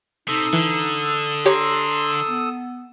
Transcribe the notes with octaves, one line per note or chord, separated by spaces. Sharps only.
C3 D#4 A4 D#6 E6
D3 E3
G4 C#5 A#5 C6
B3